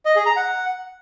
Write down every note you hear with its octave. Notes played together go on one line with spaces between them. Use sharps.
D#5
G#4
A#5
F#5